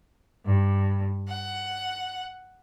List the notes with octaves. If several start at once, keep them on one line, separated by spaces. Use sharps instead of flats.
G2
F#5